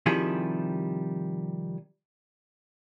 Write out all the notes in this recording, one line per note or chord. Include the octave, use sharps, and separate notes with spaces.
C3 D#3 F3 G3 E4 G#4